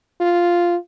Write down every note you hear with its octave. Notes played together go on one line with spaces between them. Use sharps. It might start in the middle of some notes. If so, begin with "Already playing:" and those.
F4